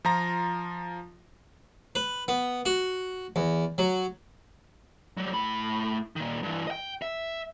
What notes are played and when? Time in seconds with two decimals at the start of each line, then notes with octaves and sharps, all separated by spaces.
0.05 F3 F4 A#5 A#6
1.95 B4
2.28 B3
2.66 F#4
3.36 E2
3.78 F#3
5.17 F#3 G3
5.33 A2 B5
6.16 A#2 D#3
6.43 G2 E3
6.68 D#5 G5
7.02 E5